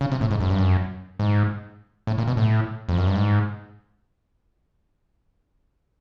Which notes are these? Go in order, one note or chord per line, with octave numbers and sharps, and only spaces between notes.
C#3
C3
A2
G#2
F#2
G2
F#2
G#2
A2
A#2
B2
A2
F2
F#2
G2
G#2